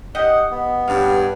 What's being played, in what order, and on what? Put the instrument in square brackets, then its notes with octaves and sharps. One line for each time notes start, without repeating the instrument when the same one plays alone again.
[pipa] D#4 G4 D#5 [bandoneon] F#5
[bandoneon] B3
[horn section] G2 [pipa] C#4 F5